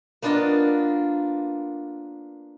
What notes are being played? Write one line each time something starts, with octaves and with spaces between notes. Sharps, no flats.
A#3 B3 D4 F4 D#5